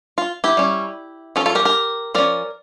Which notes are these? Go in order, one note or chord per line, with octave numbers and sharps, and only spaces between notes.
F4
E4 G4
G3 C#4
F3 C#4 F4 A4
F4 A4
G4 A#4
G4 A#4
F3 C#4 A#4 D5